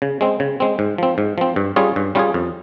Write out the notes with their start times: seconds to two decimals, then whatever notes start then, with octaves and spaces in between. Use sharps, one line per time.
0.02 C#3
0.21 G#3 C4
0.40 C#3
0.60 G#3 C4
0.79 G#2
0.98 F3 C4
1.18 G#2
1.38 F3 C4
1.56 G2
1.76 G3 C#4 F4 G#4
1.96 G2
2.15 G3 C#4 F4 G#4
2.34 F2